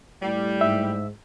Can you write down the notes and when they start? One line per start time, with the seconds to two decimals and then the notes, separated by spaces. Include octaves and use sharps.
0.22 A2 G3
0.61 G#2 E5